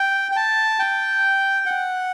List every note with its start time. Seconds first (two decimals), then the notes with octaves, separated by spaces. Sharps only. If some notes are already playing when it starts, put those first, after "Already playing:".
Already playing: G5
0.32 G5
0.36 A5
0.79 G5
1.66 F#5